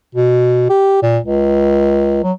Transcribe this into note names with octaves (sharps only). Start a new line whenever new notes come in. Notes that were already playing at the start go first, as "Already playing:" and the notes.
B2
G4
A#2
C#2
F#3